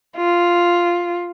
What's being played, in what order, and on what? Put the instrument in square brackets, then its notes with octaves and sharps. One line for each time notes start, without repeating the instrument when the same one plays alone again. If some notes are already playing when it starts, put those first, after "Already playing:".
[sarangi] F4